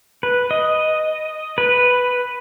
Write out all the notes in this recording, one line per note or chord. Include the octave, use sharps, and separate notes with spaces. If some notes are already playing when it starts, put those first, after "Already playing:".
B4
D#5
B4